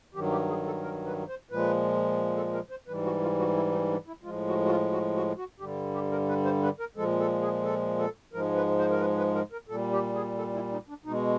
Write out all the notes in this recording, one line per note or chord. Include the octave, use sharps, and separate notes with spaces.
G2 D#3 F#3 G4
G4
G#4
A4
A#4
B4
C5
A#2 F3 G#3 B4
A4
A#4
C5
G#2 E3 G3 B4
F#4
F4
F#4
E4
D#4
D4
E4
A2 F3 G#3 F4
F#4
F#4
F4
F#4
F#4
F#4
G2 D3 G3 G4
G4
A#4
B4
C5
B4
A#4
A#2 F3 G#3 A4
A4
G#4
A4
A4
G#2 F3 G#3 A#4
B4
C5
A#4
B4
B4
A#4
A#4
A#2 G3 A4
G4
G#4
A4
E4
D#4
D4
B2 G#3 D#4